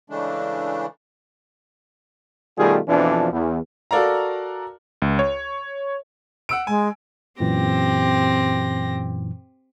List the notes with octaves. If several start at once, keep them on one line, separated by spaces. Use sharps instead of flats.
C#3 E3 G#3 A3 D4
B2 D#3 G3 A3 F4 G#4
F2 B2 E3 F3 D4
E2
F#4 A4 A#4 D5 F5 A#5
C#2
C#5
F#5 E6 D7
G#3 G#5
F#2 A#2 E3 C4 G4 A#6